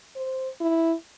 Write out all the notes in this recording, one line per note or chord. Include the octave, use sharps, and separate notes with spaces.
C5
E4